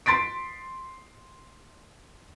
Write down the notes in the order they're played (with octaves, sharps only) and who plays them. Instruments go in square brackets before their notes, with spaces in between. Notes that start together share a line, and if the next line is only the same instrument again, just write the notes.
[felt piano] C6 A6 B6 D7